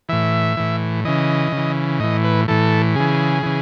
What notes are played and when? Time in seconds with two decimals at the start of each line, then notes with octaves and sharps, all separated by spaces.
0.09 A2 E3 E5
0.57 A2 E3
1.05 C#3 E3 D#5
1.52 C#3
1.57 E3
2.00 A2 E3 D#5
2.24 B4
2.48 A2 E3 A4
2.96 C#3 E3 G#4
3.43 C#3 E3